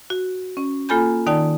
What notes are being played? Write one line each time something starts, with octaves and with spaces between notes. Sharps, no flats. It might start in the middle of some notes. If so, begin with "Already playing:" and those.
F#4
C#4
A#3 F4 A4 G#5 B5 G6
D#3 D#4 D5 G5 A5